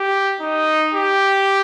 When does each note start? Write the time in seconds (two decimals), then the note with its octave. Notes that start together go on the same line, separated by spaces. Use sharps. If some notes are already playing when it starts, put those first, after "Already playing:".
Already playing: G4
0.40 D#4
0.94 G4